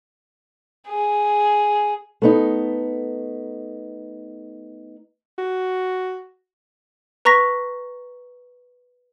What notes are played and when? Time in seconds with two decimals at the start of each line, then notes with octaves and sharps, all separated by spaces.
0.88 G#4
2.22 A3 B3 D#4
5.38 F#4
7.25 B4 A#5 C#6 A#6 B6